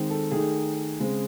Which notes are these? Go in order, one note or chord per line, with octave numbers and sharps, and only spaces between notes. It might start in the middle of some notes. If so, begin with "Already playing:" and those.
Already playing: D#3 G#3 C4 D#4
A4
D#3 A3 D#4 G#4
C#3 G#3 C4